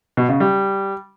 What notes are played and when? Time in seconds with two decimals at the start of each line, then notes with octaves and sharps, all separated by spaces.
0.17 B2
0.29 C#3
0.40 G3